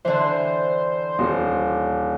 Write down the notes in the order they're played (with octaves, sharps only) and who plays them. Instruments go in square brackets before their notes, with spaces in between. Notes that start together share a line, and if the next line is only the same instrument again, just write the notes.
[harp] D3 E3 [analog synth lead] C5
[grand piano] D#1